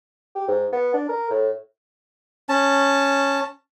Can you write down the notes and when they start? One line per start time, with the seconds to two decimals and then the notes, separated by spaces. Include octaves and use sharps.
0.35 G4
0.48 G#2
0.72 B3
0.94 D4
1.09 A#4
1.30 A2
2.49 C#4 A5